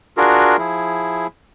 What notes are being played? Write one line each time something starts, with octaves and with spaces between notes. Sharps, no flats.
D4 F4 F#4 G#4 A#4
F3 E4 G#4